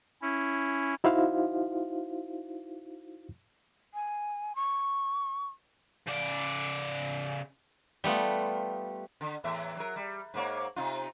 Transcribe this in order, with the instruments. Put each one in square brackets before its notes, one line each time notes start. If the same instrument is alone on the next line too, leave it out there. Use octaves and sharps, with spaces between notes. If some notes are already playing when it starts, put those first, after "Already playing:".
[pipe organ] C#4 E4
[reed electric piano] D#4 E4 F#4 C5 F5
[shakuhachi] G#5
C#6
[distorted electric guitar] C#3 D5
[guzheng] G3 A3 B3 F4
[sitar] D3
E2 A2 E5
F#3 A#4
G3
G#2 A#3 C#5
C3 D#4 F4